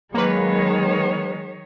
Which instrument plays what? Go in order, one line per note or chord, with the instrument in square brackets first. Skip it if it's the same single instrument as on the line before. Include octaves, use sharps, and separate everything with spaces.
[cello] D#3 C#5 [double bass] F#3 [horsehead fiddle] G#3 [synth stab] A#3 B4